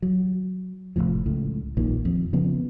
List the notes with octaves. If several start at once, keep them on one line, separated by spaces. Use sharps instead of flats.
F#3
F1 C2 A2 F3
C#2 A2
A#1 A#2 D#3
F2
C#3 F3 B3